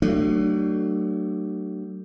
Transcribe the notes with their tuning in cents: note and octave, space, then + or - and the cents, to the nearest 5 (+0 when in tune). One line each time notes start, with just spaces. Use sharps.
F#3 +40 A3 +30 D4 +35